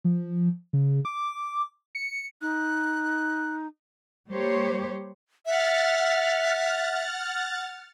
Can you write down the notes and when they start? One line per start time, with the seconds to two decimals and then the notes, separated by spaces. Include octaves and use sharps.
0.05 F3
0.73 C#3
1.05 D6
1.95 C#7
2.41 D#4 F#6
4.30 G3 A#3 G4 C5 C#5
5.46 E5 F#5 F6 A6